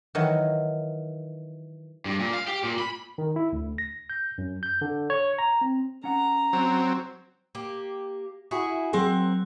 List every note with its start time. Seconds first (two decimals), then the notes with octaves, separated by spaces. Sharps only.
0.15 D#3 E3 F#3
2.05 G2
2.20 A#2
2.34 F5
2.47 G4
2.64 A#2
2.79 B5
3.18 D#3
3.36 E4
3.52 D2
3.78 A#6
4.10 G6
4.38 F#2
4.63 G6
4.81 D3
5.10 C#5
5.39 A#5
5.61 C4
6.04 C#4 F#5 A#5
6.53 F#3 C4
7.55 A#3 G4
8.51 E4 F#4 G#4
8.93 F#3 C4 G#4 A#4 F#5